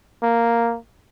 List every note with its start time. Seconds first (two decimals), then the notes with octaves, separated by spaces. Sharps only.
0.23 A#3